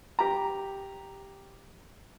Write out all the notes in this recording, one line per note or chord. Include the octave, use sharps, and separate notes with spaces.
G4 A#5